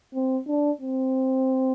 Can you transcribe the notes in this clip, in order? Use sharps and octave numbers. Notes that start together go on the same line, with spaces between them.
C4
D4
C4